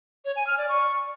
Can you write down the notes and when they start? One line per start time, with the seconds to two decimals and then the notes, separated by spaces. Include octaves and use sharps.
0.25 C#5
0.36 G#5
0.47 F6
0.58 D5
0.69 C#6